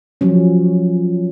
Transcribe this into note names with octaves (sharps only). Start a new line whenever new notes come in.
F3 F#3 C#4